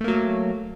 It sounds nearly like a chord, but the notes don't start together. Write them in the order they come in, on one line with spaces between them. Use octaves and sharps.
A3 A#3 F#3